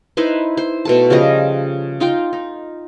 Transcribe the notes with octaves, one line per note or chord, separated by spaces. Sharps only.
D#4 E4 B4 C5
C5
B2 A3 A5
C#3 F3 G3 D#5
D#4 F4 G5
D#4